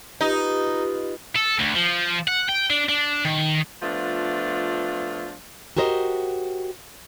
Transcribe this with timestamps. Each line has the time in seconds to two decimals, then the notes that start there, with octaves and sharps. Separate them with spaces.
0.21 D#4 F4 G4 B4 D#5
1.36 A4
1.60 D2
1.76 F3
2.28 F#5
2.49 G5
2.70 D4
2.89 D4
3.25 D#3
3.82 F3 A3 B3 D4 F4
5.77 F#4 G4 A#4 C5 D#5